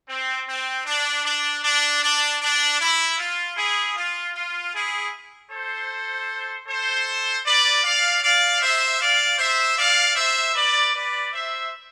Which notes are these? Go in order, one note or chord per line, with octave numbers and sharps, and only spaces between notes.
C4
C4
D4
D4
D4
D4
D4
E4
F4
E4 G#4
F4
F4
E4 G#4
A4 C5
A4 C5
B4 D5
D5 F5
D5 F5
C5 E5
D5 F5
C5 E5
D5 F5
C5 E5
B4 D5
B4 D5
C5 E5